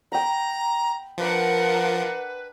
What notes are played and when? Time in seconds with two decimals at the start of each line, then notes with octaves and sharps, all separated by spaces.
0.12 G5 A#5 B5
1.18 F3 D4 A#4 B4 F#5